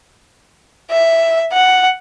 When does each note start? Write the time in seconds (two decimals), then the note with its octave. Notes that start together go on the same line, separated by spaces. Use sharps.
0.91 E5
1.52 F#5